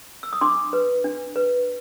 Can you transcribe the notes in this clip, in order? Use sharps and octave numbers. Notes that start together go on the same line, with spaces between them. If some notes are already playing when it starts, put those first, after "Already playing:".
E6
D#6
D4 C6 D6
B4
D4
B4